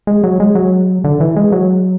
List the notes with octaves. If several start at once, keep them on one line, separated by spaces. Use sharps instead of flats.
G#3
F#3
G#3
F#3
D3
E3
G#3
F#3